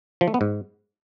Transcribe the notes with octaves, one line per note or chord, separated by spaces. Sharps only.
F3
A3
B3
G#2